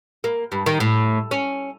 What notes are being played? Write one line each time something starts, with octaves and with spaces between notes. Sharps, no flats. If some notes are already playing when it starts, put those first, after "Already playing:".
A#3
G2
D#3
A2
C#4